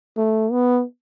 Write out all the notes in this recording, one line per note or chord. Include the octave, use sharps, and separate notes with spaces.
A3
B3